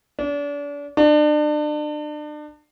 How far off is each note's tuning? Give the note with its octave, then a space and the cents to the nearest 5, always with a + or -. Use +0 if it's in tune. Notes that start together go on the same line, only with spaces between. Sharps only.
D4 -35
D4 +35